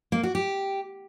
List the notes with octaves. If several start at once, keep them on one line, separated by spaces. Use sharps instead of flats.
A#3
F#4
G4